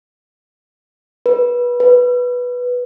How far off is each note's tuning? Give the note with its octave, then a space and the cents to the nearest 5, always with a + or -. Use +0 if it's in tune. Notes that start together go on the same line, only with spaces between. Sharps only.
B4 -25
B4 -5